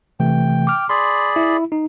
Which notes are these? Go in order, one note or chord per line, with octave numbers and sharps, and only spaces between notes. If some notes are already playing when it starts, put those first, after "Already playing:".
C3 E3 A3 G5
D6 F6
G#4 D5 B5 C6
E4
D#4